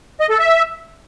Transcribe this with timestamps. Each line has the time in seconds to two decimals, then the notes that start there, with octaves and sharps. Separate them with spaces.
0.20 D#5
0.30 A4
0.39 E5